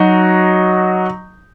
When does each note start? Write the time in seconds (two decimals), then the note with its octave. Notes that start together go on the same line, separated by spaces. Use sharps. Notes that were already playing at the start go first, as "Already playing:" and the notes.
Already playing: F#3 D#4 F#4